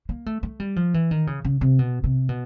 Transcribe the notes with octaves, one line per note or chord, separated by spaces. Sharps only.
A#3
A3
A3
G3
F3
E3
D#3
C#3
C#3
C3
B2
C3
B2